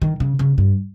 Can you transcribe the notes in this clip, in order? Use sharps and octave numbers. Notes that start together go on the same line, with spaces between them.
D#3
C#3
C#3
G2